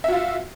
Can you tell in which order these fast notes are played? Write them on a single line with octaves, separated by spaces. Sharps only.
E5 F#4 F4